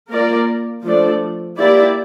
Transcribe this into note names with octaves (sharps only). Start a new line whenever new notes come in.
A#3 F4 A#4 D5
F3 A3 D4 A4 D5
A#3 E4 G4 D5